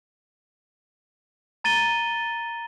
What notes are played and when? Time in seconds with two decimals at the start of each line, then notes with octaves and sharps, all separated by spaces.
1.64 A#5 A6 D#7 G7